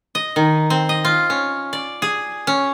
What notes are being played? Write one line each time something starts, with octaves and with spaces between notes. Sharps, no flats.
D#5
D#3
C4
D#5
F4
C#4
D5
G#4
C#4